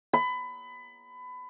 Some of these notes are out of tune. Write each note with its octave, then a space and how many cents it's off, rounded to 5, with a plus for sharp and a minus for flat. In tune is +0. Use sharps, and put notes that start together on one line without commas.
B5 +25